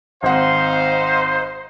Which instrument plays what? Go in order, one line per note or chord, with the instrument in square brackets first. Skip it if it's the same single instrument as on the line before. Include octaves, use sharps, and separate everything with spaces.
[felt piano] G#1 C4 F#5 [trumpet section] D#4 C5 [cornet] F5